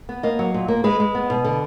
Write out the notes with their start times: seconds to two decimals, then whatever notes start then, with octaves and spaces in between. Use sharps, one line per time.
0.09 B3
0.23 A#3 D#5
0.39 F#3
0.54 A#2
0.68 A#3
0.84 G#3 B4
1.00 G#3
1.15 B3
1.30 B2
1.44 D3